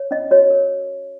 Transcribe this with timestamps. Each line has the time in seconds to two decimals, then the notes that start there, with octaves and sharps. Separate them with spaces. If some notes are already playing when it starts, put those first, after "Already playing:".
Already playing: C#5
0.11 C#4 D#5
0.31 F#4 C#5
0.50 A#4